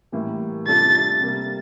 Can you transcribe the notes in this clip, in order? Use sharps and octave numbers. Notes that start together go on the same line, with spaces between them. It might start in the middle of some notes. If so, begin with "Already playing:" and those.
A2 E3 G3 A#3
C3 G3 D4 F4 A4 A6
C3 G3 A#3